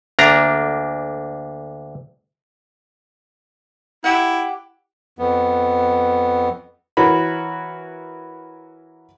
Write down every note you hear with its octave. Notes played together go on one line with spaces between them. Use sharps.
D2 A#3 D4 A#5
E4 G4 F#5
F2 B3
E3 F#4 A#4 C#5 B5